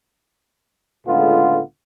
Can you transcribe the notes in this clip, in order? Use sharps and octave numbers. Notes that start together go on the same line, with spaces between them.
C#2 A2 D3 G#3 B3 F4